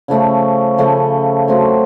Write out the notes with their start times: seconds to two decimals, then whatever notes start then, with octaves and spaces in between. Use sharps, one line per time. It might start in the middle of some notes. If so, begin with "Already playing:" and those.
0.08 C#3 F3 A3 C#4
0.78 C#3 F3 A3 C#4
1.48 F#3 A3 C4